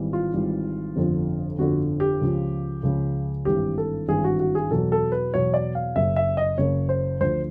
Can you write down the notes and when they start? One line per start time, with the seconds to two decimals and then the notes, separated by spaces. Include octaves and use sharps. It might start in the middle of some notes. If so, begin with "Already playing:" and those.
Already playing: G#1 G#2 E3 G3
0.13 F4
0.34 G#1 G#2 E3 G3
0.96 G1 F2 D3 F3
1.59 G1 F2 D3 F3 F#4
2.00 G4
2.21 C#2 C#3 F3
2.83 C#2 C#3 F3
3.45 G#1 G2 E3 G4
3.78 A4
4.08 G#1 G2 E3 G#4
4.24 F#4
4.40 F#4
4.55 G#4
4.71 E2 B2 F#3 A4
4.92 A4
5.12 B4
5.34 E2 B2 F#3 C#5
5.54 D5
5.75 F5
5.96 F#1 F#2 C#3 E5
6.16 E5
6.37 D#5
6.58 F#1 F#2 C#3 C#5
6.89 C5
7.21 D2 D3 F3 C5